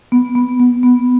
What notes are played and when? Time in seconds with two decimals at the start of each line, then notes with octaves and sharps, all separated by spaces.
0.12 B3
0.35 B3
0.60 B3
0.83 B3